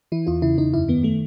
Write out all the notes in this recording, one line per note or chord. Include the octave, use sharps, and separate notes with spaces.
E3 E4
E2 F4
C#3 E4
E2 D#4
F#2 E4
D#3 B3
D#3 A3